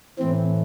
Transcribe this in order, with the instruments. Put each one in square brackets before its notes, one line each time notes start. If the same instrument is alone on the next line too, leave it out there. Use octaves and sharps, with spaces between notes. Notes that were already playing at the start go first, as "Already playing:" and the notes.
[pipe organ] A2 E3 C4